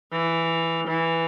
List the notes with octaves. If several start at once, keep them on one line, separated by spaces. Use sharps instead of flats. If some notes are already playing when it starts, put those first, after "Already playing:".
E3
E3